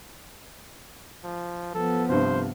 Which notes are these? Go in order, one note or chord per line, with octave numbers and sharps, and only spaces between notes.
F3
F3 B3 A4
C2 G2 C5